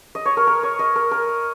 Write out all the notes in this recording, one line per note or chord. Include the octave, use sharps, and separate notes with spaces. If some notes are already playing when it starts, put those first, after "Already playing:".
D#5
C#5
A#4
A#4
C#5
D#5
A#4
A#4